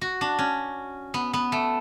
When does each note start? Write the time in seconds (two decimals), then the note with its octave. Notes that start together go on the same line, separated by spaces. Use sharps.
0.01 F#4
0.21 D4
0.39 C#4
1.14 B3
1.33 B3
1.52 A3